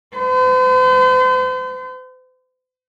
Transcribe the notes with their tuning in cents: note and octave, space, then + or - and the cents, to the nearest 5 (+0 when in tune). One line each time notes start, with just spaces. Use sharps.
C5 -45